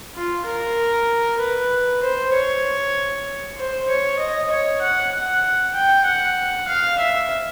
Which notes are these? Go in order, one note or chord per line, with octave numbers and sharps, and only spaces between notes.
F4
A#4
B4
C5
C#5
C5
C#5
D#5
C#5
F#5
F#5
G5
F#5
F5
E5